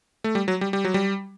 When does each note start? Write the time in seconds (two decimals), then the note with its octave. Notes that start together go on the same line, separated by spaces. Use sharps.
0.24 A3
0.35 G3
0.48 F#3
0.61 G3
0.73 G3
0.85 F#3
0.94 G3